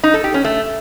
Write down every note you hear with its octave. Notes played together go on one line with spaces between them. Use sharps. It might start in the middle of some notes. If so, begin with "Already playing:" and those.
D#4
A4
G4
C#4
A3